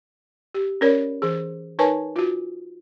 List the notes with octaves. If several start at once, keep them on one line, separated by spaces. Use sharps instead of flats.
G4
C#4 A#4 C#5 D5
E3 G#4
D#4 A#4 B4 C#5 G#5 A5
F4 F#4